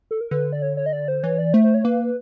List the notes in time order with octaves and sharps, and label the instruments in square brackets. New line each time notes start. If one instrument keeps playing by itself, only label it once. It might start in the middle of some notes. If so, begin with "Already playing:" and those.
[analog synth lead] A4
A#4
[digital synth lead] D3 [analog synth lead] B4
[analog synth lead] D5
C#5
C#5
D#5
D5
C5
[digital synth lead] E3 [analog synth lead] C#5
[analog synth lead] D5
[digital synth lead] A3 [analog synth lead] C5
[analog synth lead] C5
C#5
[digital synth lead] A#3 [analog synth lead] B4